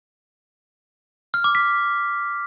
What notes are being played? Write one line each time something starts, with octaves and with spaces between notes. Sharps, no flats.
F6
D6
B6